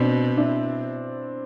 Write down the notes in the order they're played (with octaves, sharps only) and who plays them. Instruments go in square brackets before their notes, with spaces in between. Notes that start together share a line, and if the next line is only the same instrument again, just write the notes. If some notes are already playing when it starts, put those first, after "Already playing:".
Already playing: [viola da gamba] B2 [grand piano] C4 D4
[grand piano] D4 E4